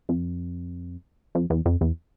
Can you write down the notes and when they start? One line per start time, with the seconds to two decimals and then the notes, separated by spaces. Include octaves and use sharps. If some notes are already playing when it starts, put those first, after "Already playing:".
0.09 F2
1.35 F2
1.50 E2
1.66 F2
1.81 E2